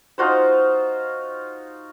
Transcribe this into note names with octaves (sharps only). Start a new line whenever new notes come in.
D#4 F4 F#4 C5